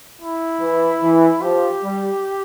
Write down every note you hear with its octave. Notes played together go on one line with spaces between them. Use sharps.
E4
E3
E3
F3 G4
G3